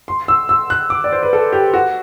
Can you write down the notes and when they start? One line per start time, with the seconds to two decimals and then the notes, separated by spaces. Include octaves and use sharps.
0.08 C6
0.28 E6
0.49 E6
0.70 F#6
0.90 D6
1.04 D5
1.13 C5
1.23 B4
1.33 A4
1.53 G4
1.74 F#4